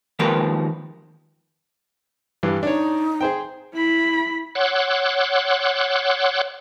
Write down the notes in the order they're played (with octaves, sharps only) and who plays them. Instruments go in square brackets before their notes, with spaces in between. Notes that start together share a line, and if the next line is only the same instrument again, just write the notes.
[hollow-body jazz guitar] D#2 F3 G#3 A#4 B4
[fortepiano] G2 E3 G3
[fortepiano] D4 C#5 [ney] D#4
[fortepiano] G#4 C5 G5
[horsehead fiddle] E4 B5
[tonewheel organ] C#5 F#5 C6 D6 E6 F#6